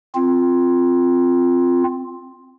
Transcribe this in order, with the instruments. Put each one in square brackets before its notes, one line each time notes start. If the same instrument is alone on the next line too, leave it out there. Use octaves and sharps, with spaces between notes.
[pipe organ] C4 F4